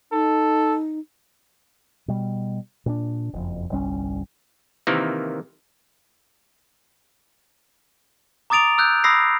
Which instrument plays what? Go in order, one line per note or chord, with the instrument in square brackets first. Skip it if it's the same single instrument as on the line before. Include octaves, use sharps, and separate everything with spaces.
[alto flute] D#4 [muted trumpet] A4
[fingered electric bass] B2 G3
A#2 C4 D4
F#1 F2
G1 C2 G3 C#4
[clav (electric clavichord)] C3 D#3 E3 A#3
[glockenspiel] A#5 D6 D#6 A6 D7 F7
E6 F#6 G6
B5 D#6 E6 A#6 C7